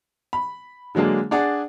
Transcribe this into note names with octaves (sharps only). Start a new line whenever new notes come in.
B5
D3 F#3 G#3 A#3 D4
D4 G#4 D5 F#5